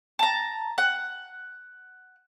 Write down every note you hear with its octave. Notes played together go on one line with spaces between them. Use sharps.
A5 A#5
F#5